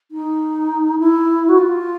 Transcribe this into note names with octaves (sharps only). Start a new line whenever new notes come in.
D#4
E4
F#4
F4